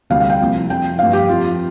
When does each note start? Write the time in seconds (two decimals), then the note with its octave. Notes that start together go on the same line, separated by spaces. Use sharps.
0.10 D2 C3 G3 F5
0.20 F5
0.30 G5
0.40 C2 C3 F3
0.70 F2 F3 G5
0.99 G2 F3 F5
1.13 G4
1.29 F2 F3 F4